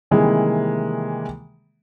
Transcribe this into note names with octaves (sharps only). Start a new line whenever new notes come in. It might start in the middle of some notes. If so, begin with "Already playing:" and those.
C3 D#3 E3 G3 G#3 A#3